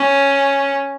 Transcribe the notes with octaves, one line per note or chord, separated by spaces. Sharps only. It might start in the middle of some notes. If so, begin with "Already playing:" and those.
Already playing: C#4